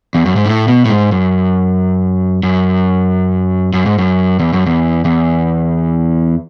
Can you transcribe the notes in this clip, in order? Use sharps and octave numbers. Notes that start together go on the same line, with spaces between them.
E2
F#2
G#2
A2
B2
A2
G#2
F#2
F#2
F#2
G#2
F#2
E2
F#2
E2
E2